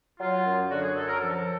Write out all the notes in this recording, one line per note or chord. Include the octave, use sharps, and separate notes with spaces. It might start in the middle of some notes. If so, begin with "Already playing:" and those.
F#3 F4
F#2
D3 F#4
G#4
F#2 A4
A#4
F3 A4